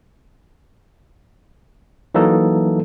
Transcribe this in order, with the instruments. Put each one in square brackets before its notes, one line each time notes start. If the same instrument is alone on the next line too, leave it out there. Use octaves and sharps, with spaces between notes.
[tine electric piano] E3 F#3 A#3 D#4 A4